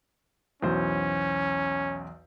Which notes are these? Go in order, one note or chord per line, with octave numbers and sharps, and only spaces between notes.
B1 E2 C#4 C5